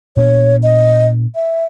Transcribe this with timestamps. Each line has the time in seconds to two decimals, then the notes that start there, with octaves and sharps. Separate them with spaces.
0.17 A#2 B3 D4 C#5
0.63 D#5
1.35 E5